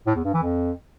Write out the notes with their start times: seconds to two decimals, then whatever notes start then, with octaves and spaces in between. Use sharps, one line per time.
0.07 A2
0.16 E2
0.25 G2
0.34 E3
0.43 F2